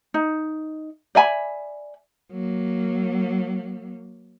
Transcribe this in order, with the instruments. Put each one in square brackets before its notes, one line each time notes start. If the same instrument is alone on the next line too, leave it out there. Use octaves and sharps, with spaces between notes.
[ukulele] D#4
D5 E5 G#5 B5
[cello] F#3 A#3